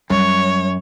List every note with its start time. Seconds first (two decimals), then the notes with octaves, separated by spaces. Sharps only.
0.10 F#2 G3 C#5